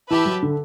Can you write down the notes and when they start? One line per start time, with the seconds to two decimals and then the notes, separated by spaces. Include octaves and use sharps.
0.10 E3 G4 B4 E5 A5
0.25 F#3
0.42 D3